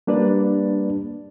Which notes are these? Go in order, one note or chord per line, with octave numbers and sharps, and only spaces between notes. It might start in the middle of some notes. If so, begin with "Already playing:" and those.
G3 A#3 D4 G4 B4 D5